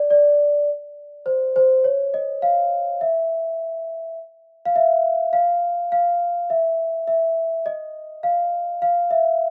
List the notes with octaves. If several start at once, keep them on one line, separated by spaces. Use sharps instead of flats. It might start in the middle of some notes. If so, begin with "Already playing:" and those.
Already playing: D5
D5
C5
C5
C#5
D#5
F5
E5
F5
E5
F5
F5
E5
E5
D#5
F5
F5
E5